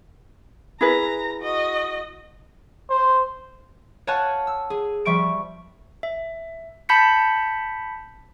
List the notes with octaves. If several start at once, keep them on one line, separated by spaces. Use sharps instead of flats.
E4 G#4 B4 A#5
F#4 D#5
C5
C#5 F5 F#5 G#5 A5 F#6
E6
G#4
F3 G3 E5 C#6 D7
E5
A5 B5 G6 B6 C#7